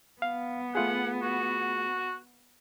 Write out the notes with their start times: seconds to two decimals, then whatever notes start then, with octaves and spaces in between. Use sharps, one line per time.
0.22 B3 F5
0.75 A3 F4 G#4 F#5
1.22 F#4